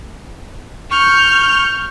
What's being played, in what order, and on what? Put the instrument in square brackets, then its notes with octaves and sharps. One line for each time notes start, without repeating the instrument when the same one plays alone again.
[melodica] C#6 [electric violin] F6 G6